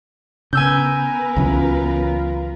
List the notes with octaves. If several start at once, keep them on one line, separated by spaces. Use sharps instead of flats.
C#3 B3 A#4 B4 G#5 E6 G6
C#2 E3 F#3 C#4 F4